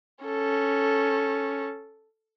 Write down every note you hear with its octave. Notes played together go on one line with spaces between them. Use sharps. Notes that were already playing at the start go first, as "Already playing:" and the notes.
C#4 A4